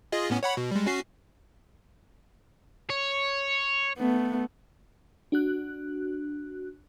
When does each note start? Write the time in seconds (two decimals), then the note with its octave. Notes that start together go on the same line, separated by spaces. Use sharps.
0.12 F4 G#4 D#5
0.30 A2 B3 C#4
0.43 C#5 F#5 B5
0.57 B2
0.71 G3 G#3
0.86 C#4 F#4 C7
2.90 C#5
3.98 A3 B3
5.32 D4 F#4 F#6